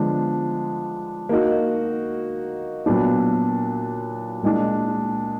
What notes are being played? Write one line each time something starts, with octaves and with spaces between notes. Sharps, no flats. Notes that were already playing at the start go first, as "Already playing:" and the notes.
Already playing: D3 F3 G#3 B3 D4
A#3 D#4 F#4
A#2 F#3 B3 D4
A#2 G#3 D4